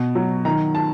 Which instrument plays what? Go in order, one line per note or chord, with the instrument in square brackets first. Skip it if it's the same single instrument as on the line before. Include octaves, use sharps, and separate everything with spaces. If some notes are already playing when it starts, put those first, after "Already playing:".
Already playing: [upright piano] B2
F#3
D#3 A#5
A5